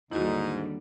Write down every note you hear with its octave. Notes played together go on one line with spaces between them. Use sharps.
D#2 G#2 D3 G3 D#4 E4 F#4